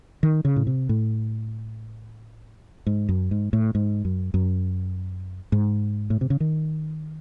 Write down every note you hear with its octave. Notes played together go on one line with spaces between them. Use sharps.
D#3
C#3
A2
C3
A2
G#2
F#2
G#2
A2
G#2
F#2
F#2
G#2
A2
C3
C#3
D#3